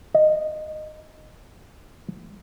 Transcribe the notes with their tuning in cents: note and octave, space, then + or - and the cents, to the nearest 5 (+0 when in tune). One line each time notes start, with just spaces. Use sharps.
D#5 -15